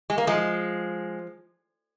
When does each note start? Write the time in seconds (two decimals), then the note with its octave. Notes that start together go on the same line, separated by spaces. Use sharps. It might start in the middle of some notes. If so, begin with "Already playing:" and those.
0.10 G#3
0.18 A#3
0.27 F3 G#3